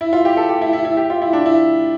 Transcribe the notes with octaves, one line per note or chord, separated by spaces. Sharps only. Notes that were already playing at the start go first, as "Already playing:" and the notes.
E4
F4
G4
A4
G4
E4
E4
E4
G4
F4
E4
D4
E4